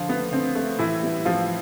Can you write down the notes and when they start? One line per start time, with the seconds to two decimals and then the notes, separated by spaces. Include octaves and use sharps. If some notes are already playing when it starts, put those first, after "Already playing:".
Already playing: D3 F3 F4
0.08 A3 B3
0.32 D3 C4
0.55 A3
0.79 A2 E3 E4
1.02 G3 B3
1.25 A2 F3 F4